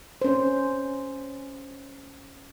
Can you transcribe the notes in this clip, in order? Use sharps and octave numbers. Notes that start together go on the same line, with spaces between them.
C#4 C5